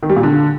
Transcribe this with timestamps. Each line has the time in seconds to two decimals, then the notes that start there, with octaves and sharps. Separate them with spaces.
0.03 D#3
0.10 G3
0.16 A#2
0.23 D3